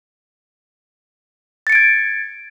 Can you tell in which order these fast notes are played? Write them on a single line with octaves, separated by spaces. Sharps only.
A6 C#7 D7 G#6